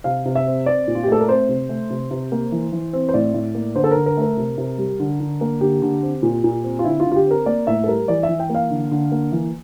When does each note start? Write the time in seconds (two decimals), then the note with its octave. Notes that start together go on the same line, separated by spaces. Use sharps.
0.04 C3 F5
0.25 C3
0.35 E5
0.47 C4
0.66 C4 D5
0.88 A#2
0.95 F4
1.03 G4
1.08 A3 A4
1.20 A#4
1.29 C4 C5
1.49 C3
1.69 A3
1.90 C3
2.11 C3
2.32 A#3
2.52 E3
2.72 E3
2.93 C4
3.09 C5
3.14 A2 D5
3.34 A2
3.55 A#3
3.75 D3 C5
3.84 A4
3.91 A#4
3.96 D3
4.06 A#4
4.17 A3 A#4
4.37 C3
4.58 C3
4.78 G3
4.99 D3
5.20 D3
5.41 A#3
5.61 D3 G4
5.82 D3
6.03 C4
6.23 A#2
6.44 A#2
6.64 C4
6.79 F4
6.85 D3 E4
7.00 F4
7.06 D3
7.12 F4
7.16 G4
7.26 C4 A#4
7.46 A#3 D5
7.67 A2 E5
7.84 A4
7.88 G3 A#4
8.08 E3 D5
8.23 E5
8.29 E3
8.39 G5
8.50 A#3 F5
8.70 D3
8.91 D3
9.12 A#3
9.32 E3